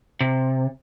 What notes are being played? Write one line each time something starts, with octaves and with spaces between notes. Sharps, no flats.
C3